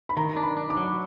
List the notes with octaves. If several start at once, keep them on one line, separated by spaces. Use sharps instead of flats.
B5
D#3 A#5
D4
B5
D4
D6
F#3